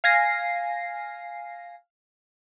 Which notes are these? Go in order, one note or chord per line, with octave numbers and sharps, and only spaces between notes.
F5 G#5 A#6 C7